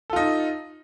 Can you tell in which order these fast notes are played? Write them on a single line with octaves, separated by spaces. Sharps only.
A4 F4 D#4